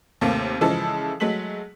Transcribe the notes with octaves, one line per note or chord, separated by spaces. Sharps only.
D#2 C3 A3 A#3
C#3 E3 F3 G#3 E4 A4
F#3 G#3 A3 B6 F#7